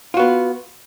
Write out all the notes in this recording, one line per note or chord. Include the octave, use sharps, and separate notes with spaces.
B3 F4 F#4